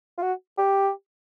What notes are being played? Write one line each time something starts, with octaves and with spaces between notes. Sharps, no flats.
F4
F#4
G4